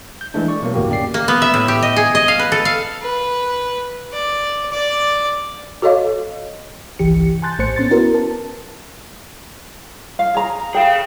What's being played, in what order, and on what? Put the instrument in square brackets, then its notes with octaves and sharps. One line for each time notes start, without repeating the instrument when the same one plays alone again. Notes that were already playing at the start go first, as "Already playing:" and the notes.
[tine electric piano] G6
E3 G#3 A3 D4
D5 C#6
B2 F#3 A#3
G1 D#2 A2 A#3 F#4 G4
C#4 G4 D5 C7
[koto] A#3
B3
E5
A2
G4
D#5
G#4
D#5
F5
B4
A4
F5
[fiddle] B4
D5
D5
[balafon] F#4 A4 C#5 D#5 F5
[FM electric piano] G1 C2 E3 G4 C#7
G#5 A5 C6 F#6 G6 A6
A#1 A2 A3 C5 C6 C#7
B3 C#4 C6 A6
B3 C#4 E4 F#4 A#4 B4
A#4 A5
[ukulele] F5
G#4 A#5
[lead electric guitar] G#4 F5 [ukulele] G5